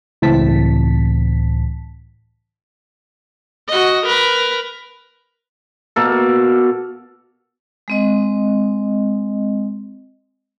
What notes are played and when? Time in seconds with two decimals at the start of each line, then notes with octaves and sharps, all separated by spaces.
0.22 C#2 A2 E3 C4 A5 B6
3.68 F#4 D#5
4.06 A#4 B4
5.96 B2 A#3 A4
7.88 G#3 C4 D#5